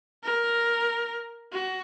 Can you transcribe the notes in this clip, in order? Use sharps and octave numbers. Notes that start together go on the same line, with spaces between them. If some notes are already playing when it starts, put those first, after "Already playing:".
A#4
F#4